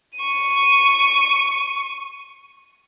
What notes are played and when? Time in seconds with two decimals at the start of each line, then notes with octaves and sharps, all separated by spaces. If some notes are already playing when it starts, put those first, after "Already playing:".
0.17 C#6 D#7